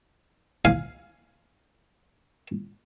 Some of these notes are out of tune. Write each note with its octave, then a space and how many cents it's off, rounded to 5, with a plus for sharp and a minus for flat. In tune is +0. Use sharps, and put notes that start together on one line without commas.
F5 -5 G#5 +0